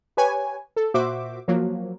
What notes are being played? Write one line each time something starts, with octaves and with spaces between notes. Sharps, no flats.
G4 B4 C#5 G#5
A4
A#2 F#4 C5 E5 D6
F3 F#3 A#3